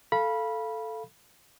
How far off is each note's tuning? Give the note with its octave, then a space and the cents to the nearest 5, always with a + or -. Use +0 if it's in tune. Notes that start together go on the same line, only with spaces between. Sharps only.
A4 +0 F5 -10 B5 -20